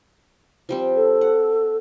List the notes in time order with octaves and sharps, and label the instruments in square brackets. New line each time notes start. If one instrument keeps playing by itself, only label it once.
[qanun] F3 G3 C4
[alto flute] A4
[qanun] F#5